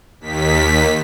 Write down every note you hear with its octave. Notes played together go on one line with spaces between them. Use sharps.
D#2 B6